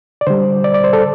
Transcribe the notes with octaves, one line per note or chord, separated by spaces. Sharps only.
D5
D3 G3 C5
D5
D5
C5
A4